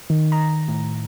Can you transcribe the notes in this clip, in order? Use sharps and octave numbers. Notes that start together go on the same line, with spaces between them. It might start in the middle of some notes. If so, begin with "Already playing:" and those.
D#3
A#5
A2